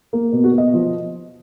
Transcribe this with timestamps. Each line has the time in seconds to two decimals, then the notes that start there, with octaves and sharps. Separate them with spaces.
0.13 A#3
0.32 B2
0.44 F#4
0.53 B2 D#5
0.74 F3